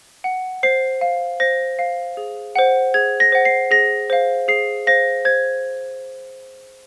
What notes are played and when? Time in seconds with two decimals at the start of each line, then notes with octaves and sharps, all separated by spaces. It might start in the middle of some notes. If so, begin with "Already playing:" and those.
0.24 F#5
0.63 C5 C7
1.01 F5
1.40 C5 A#6
1.79 F5
2.17 G#4
2.55 C5 F#5
2.94 G#4 G#6
3.20 A#6
3.32 C5 F#5
3.45 C7
3.71 G#4 A#6
4.10 C5 F5
4.48 G#4 C7
4.87 C5 F5 A#6
5.25 C5 G#6